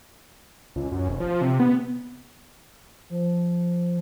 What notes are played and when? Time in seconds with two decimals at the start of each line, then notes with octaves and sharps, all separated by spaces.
0.76 C#2
0.92 F#2
1.09 F1
1.20 F3
1.41 C3
1.60 B3
3.10 F3